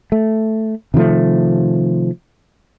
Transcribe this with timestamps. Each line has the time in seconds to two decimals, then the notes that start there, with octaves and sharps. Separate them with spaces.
0.12 A3
0.94 C3 D#3 F3 A3